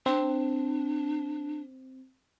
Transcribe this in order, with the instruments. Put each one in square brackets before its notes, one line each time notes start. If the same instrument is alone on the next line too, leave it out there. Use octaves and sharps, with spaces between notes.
[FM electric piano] C4 [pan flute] D4